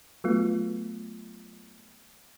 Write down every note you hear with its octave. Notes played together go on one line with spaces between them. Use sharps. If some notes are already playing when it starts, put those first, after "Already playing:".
F#3 A3 B3 F4